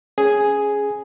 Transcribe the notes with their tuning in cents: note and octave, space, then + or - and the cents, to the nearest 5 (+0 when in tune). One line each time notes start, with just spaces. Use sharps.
C#4 +5 G#4 +0